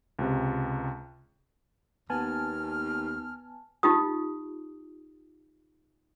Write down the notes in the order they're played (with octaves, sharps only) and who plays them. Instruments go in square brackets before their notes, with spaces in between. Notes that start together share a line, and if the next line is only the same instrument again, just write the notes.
[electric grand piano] C#2 C3
[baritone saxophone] D#2 [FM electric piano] B3 G#5 A5 [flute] F6
[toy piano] D#4 F4 G4 D#6